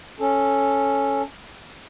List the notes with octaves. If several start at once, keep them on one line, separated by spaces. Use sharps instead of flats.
C#4 A4